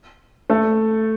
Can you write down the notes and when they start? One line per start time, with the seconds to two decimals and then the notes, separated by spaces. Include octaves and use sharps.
0.50 A3 A4